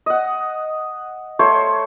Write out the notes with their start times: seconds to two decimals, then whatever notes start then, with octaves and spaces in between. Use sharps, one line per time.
0.06 D#5 F#5
1.39 A3 C5 C#5 C#6